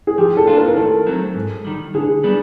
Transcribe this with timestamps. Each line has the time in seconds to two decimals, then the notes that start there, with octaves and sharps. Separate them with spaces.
0.07 G#4
0.18 F3 G4
0.37 A4
0.47 A#3 D4 F4
0.57 A#4
0.68 A#4
0.76 D#3 A4
1.06 F#3 A3 C4
1.35 G#2
1.65 D#3 G3
1.94 D3 G#4
2.23 G3 B3 D4